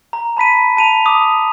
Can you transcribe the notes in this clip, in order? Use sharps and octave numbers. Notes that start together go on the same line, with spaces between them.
A#5
A5 B5 B6 D#7
A5 D#7 F7
D6 D#6